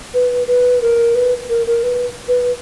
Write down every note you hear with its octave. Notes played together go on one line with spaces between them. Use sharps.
B4
B4
A#4
B4
A#4
A#4
B4
B4